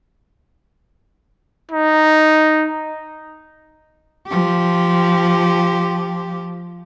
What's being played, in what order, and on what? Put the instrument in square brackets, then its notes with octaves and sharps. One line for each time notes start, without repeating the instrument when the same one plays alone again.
[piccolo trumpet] D#4
[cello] F3 G4